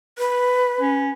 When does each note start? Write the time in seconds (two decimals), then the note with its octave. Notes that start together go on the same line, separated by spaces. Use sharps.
0.19 B4
0.81 C#4